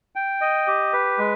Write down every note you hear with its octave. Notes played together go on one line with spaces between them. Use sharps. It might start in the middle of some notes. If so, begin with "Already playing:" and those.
G5
D#5
G4
B4
G#3